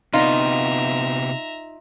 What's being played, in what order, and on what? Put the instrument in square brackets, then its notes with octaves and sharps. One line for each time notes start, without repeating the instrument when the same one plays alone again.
[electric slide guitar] C3 B3 [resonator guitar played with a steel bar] D#4 [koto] F4 [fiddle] E5 A#5